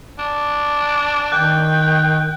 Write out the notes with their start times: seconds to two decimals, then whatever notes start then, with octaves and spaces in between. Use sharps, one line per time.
0.19 D4
1.32 D#3 G5 F#6